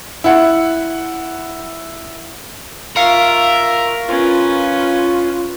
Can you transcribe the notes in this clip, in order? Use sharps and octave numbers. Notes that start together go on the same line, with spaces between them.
E4 F#5
F4 A#4 E5 F5 C#6
C#4 F4 B4